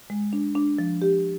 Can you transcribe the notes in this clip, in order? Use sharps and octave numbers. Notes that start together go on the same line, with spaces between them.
G#3
D4
D4
F3
G4